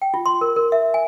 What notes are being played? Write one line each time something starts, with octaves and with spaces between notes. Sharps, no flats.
G5
F4
C6
A#4
A#4
E5
G#5